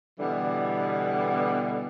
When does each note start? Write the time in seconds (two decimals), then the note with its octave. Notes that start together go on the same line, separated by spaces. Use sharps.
0.20 B2 D3 E3 G3